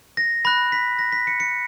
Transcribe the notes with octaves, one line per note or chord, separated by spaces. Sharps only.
A#6
B5 F#6 A#6
B6
A#6
B6
C#7
C#7